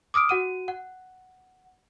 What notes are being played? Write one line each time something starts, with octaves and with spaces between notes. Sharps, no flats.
D6 D#6 F6 D7
F#4 F#5 D#7
F#5